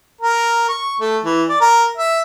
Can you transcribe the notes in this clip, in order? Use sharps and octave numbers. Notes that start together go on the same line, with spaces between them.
A#4
C#6
A3
E3
D5
A#4
E5